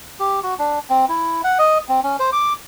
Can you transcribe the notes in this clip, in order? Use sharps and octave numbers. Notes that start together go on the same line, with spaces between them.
G4
F#4
D4
C4
E4
F#5
D#5
C4
C#4
C5
D6